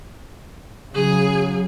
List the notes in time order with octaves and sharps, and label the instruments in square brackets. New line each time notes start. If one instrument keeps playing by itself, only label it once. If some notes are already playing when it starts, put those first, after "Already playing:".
[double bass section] C#3 F#3 [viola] G#4